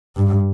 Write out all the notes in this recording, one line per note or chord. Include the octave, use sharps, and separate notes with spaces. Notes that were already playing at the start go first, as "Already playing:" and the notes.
G2